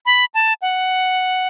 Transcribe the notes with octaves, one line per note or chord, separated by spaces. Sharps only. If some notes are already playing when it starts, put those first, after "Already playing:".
B5
A5
F#5